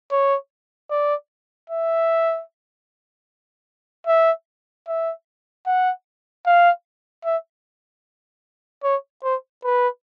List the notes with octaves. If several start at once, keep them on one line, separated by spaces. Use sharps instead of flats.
C#5
D5
E5
E5
E5
F#5
F5
E5
C#5
C5
B4